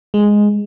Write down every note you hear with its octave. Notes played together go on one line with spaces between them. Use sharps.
G#3